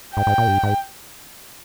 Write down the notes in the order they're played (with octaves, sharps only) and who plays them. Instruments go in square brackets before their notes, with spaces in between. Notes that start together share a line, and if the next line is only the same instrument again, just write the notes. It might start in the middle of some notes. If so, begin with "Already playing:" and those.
[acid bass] G#2 [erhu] G5
[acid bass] G#2
A#2
G2
G#2